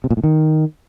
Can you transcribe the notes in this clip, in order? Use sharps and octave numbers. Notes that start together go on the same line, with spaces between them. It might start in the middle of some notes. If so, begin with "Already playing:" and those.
C3
A#2
A2
D#3